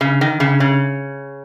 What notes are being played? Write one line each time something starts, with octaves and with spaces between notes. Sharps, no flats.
C#3
D#3
C#3
C#3